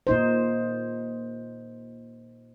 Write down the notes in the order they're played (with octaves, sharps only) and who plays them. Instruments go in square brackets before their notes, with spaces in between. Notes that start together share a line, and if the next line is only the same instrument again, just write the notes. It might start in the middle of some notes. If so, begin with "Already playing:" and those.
[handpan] A#2 D#4 C5